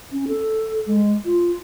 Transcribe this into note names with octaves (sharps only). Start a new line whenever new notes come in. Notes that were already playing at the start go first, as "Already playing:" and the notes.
C#4
A4
G#3
F4